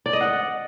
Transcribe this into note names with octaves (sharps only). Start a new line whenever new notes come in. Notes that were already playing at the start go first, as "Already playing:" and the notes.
D5
D#5
F#5